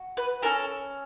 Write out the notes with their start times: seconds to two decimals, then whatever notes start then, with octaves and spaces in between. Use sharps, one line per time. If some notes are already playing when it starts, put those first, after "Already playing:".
Already playing: F#4
0.17 B4
0.42 C#4 F#4 A4 A#4